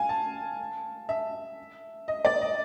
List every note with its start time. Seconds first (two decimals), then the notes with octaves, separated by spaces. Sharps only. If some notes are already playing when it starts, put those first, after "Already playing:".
Already playing: F5 G#5
0.09 A5
1.09 E5
2.08 D#5
2.25 D5
2.41 D#5